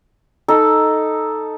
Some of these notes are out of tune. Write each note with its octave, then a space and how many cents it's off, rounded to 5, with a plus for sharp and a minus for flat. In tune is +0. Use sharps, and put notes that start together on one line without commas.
D#4 +0 A4 +0